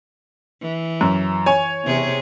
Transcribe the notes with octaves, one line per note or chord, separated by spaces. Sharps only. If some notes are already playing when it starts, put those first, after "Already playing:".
E3
F#2
C#5 G#5
E2 C3 G#4